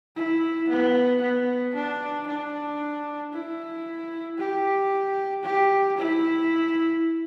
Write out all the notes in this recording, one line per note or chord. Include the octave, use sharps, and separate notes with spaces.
E4
B3
B3
D4
D4
E4
G4
G4
E4